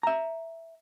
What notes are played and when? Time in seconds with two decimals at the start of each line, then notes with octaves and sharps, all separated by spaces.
0.03 E5 A#5